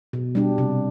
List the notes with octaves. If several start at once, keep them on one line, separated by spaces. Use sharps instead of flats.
B2
G3 D4 G4
C3